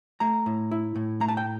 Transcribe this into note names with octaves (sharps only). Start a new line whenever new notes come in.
A3 A#5
A2
E4
A2
A3 A#5
A5
G5